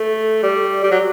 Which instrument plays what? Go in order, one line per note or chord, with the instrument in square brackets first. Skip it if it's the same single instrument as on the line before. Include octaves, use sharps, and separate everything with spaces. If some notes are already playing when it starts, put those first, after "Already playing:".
Already playing: [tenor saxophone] A3
G3
G3
F#3